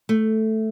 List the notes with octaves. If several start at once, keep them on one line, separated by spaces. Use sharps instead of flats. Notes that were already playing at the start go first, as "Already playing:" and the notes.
A3